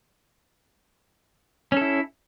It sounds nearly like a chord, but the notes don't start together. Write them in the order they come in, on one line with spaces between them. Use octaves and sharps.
C#4 A4 E4